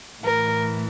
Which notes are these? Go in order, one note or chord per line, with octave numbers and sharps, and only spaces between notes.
A2 E3 A3 A#4